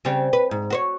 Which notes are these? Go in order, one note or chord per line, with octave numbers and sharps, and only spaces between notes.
C#3 G3 C4
B4
G#2
F#4 C5 C#5